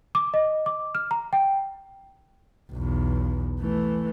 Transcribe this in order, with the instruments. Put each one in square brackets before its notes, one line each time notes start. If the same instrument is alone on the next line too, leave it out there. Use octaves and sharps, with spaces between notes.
[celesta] D6
D#5
D6
F6
A#5
G5
[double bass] B1 E2
E3 A3